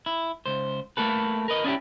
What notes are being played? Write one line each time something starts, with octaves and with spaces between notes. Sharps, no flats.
E4
C#2 C5
A3 A#3 A4 B4
A#4 B4 D#5
C#4 D4 E4 G4